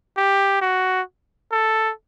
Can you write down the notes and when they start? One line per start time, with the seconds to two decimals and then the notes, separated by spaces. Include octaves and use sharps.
0.17 G4
0.61 F#4
1.52 A4